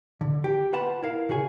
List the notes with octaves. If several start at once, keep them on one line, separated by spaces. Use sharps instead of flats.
D3
G4
F4 B4 F#5 A5 B5
E4 A#4 F5
C#3 F#4 G#4 G#5